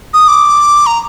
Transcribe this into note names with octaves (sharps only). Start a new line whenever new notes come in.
D#6
D6
A#5